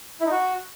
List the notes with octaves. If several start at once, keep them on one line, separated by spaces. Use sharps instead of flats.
E4
D#4
F#4